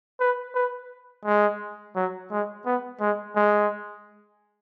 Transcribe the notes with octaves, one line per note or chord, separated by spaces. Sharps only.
B4
B4
G#3
F#3
G#3
B3
G#3
G#3